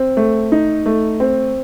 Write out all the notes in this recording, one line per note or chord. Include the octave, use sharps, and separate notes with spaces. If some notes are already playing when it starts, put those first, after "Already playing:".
Already playing: C4
A3
D#4
A3
C4